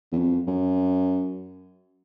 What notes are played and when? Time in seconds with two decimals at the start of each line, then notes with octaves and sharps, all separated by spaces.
0.12 E2
0.18 F2
0.48 F#2